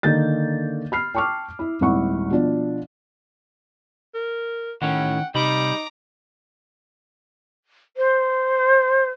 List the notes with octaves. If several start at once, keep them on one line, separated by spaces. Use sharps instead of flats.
D3 D#3 A#3 G6 A6
B5 F6 C7
G5 A5 C#6 D6 F6
E4 B5
D#1 G#1 E4 F#5 C#6
B2 F3 D4
A#4
A2 D#3 C#4 F#5 G5
C3 G3 D#4 A#5 B5 D6
C5